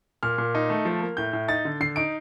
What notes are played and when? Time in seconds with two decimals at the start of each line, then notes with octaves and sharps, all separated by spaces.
0.23 A#2 F6
0.38 A#2
0.55 D#4
0.70 A3
0.85 F3
1.01 A#3
1.17 A2 G6
1.33 A2
1.48 D#4 A6
1.65 D3
1.81 D3 C7
1.96 D#4 D7